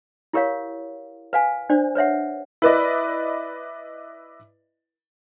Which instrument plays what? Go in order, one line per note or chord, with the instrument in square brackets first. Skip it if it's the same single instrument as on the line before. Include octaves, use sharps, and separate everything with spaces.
[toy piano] E4 G4 A#4 C#5 F5
B4 F5 G#5
D4 C5 D5
B4 C#5 E5 F#5
[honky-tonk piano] E4 B4 D5 D#5